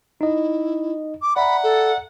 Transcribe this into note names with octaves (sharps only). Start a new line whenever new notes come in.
D#4 E4 D#5
D6
D5 E5 F#5 A#5 B5
A4